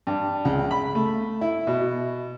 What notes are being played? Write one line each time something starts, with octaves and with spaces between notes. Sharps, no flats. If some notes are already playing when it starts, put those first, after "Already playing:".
G2
C#2
B5
A3
E4
B2